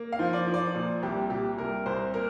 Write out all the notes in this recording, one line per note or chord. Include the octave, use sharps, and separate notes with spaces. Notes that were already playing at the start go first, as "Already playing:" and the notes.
Already playing: A#3
F5
F3
D5
F3
D5
A#2
C2 G4
A#2 G4
C2 A#4
C2 C5
A#3 A#4